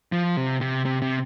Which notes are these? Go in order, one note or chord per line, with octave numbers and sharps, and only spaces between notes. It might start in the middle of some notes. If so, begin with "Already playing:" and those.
F3
C3
C3
C3
C3